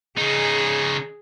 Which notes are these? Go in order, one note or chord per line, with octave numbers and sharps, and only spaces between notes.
C#3 D#4 G#4